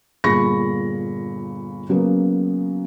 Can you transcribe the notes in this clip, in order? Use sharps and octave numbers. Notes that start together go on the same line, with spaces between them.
G1 A#2 G#4 B5 C#6 A#6
C#3 F#3 A#3 B3